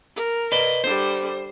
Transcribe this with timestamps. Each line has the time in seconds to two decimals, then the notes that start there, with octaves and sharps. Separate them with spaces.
0.16 A#4
0.52 B4 D5 D#5
0.84 D3 G3 C5